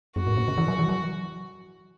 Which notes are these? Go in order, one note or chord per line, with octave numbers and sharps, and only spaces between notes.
F#2 F#4
G#2
A#2
C#3
E3
F#3
E3
F#3